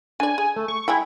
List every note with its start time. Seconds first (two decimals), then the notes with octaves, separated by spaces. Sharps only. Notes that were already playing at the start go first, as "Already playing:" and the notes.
0.20 D4 D5 G#5
0.38 G#4
0.56 A3
0.68 C#6
0.88 G#3 E4 G#4 G5